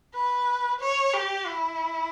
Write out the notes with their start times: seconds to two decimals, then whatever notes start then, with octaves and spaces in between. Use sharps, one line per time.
0.14 B4
0.80 C#5
1.13 G4
1.46 E4